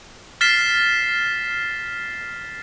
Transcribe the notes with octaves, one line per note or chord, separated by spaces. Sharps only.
F6 A6 B6 C7 E7